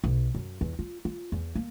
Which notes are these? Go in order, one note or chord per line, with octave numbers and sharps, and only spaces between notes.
B1
F#2
E2
F4
F4
E2
A#3